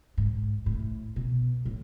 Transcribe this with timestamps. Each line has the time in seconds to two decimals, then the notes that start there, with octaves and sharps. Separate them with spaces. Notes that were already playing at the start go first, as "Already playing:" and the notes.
0.17 G#2
0.66 A2
1.16 B2
1.65 A2